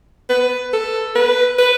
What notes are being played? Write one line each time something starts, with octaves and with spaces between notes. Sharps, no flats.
B4
A4
B4
B4